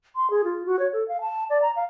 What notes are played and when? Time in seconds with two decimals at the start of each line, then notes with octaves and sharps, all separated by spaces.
0.16 C6
0.30 G#4
0.44 F4
0.66 F#4
0.79 C#5
0.93 A4
1.08 F5
1.21 A5
1.50 D5
1.62 A#5
1.76 F5